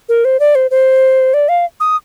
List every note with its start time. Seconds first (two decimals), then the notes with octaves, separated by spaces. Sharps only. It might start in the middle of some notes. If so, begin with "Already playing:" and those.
0.09 A#4
0.25 C5
0.40 D5
0.55 C5
0.71 C5
1.34 D5
1.49 F5
1.80 D#6